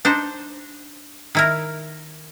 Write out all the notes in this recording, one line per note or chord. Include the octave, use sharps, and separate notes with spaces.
D4 D#4 C5
D#3 E4 A#4